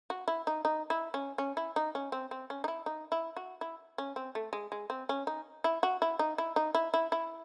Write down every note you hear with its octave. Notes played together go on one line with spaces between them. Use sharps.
F#4
E4
D#4
D#4
E4
C#4
C#4
E4
D#4
C#4
C4
C4
C#4
D#4
E4
D#4
E4
F#4
E4
C#4
C4
A3
G#3
G#3
C4
C#4
D#4
E4
F#4
E4
D#4
E4
D#4
E4
E4
E4